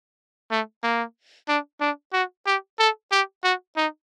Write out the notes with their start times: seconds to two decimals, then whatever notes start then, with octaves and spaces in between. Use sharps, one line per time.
0.51 A3
0.83 A#3
1.49 D4
1.81 D4
2.13 F#4
2.47 G4
2.79 A4
3.12 G4
3.44 F#4
3.77 D#4